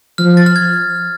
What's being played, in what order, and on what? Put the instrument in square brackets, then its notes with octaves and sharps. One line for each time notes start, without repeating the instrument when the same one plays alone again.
[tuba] F3 [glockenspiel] F6
[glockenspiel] A6
F6
G#6